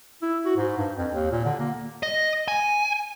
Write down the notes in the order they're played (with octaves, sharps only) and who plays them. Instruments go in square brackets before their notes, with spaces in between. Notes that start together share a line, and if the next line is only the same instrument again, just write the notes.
[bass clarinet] E4
F#4
G#2
G2
F2
D#2
A#2
D3
A#3
[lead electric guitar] D#5
G#5